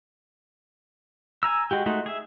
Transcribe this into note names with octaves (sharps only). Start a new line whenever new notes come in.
G#5 A#5 E6
G#3 F#4 G4
G#3 A3 D#4 F#4
G#4 E5